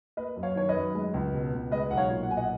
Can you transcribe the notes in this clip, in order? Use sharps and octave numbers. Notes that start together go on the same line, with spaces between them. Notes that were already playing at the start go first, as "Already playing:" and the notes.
A#3 B4 D#5
F#2
C#5 F5
D#3 C#5
B4 D#5
F#2
G#3
C#2
B2
C#2
G#3 B4 D#5
B1 F#5
C#5 F5
A#2
F#5
B1 G#5
D#5 F#5